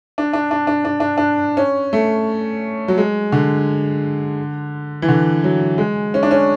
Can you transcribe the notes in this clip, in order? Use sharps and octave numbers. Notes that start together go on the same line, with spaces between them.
D4
D4
D4
D4
D4
D4
D4
C#4
A3
F#3
G#3
D3
E3
D3
F#3
G#3
C#4
D4
C#4